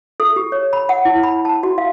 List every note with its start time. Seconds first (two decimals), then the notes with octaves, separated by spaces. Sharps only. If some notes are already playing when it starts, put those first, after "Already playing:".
0.20 A4
0.36 G4
0.52 C#5
0.73 B5
0.89 F#5
1.05 E4
1.23 B5
1.45 A5
1.63 F#4
1.78 F5